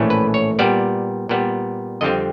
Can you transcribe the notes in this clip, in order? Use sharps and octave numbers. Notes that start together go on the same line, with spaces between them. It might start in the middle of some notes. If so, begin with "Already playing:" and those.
Already playing: A#1 A2 E3 A3 C#4
B4
C#5
A#2 G3 B3 D5
A#2 G3 B3
F2 D3 G3 C4 D#5